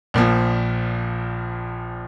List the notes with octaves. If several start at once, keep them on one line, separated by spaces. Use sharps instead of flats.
A#1 A#2 F3